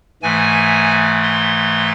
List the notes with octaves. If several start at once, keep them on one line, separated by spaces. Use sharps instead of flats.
G#2 E3 A3 G#5
C6